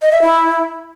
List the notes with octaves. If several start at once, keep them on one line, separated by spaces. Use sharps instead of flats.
D#5
E5
E4